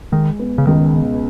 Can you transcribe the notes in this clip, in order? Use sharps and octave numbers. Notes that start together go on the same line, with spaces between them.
D#3 G#3
B3
C#3
C#2 D#3
B2